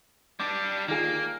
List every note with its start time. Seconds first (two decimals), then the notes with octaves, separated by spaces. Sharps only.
0.40 G3 D4 D6
0.88 D#3 A#3 F4 G#4